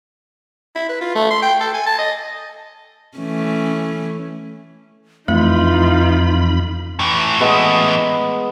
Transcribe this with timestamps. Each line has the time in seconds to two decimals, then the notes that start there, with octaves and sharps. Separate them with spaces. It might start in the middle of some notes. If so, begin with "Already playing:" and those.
0.76 E4
0.89 B4
1.01 F4
1.15 A3
1.31 C6
1.42 G5
1.60 A4
1.74 G#5
1.86 A5
1.99 D#5
3.18 E3 A3 C#4
5.28 F2 E3 A3 D#4 F4 B5
6.99 A2 E3
7.40 G#3 B3 G#4